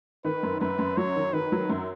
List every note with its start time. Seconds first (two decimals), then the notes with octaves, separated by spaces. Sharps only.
0.24 D#3 B4
0.43 F#2
0.61 F#2 B4
0.79 F#2
0.97 F#3 C#5
1.16 D#3
1.33 D#3 B4
1.52 F#3
1.69 F#2